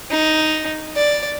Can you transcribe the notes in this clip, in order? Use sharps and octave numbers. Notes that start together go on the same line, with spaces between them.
D#4
D5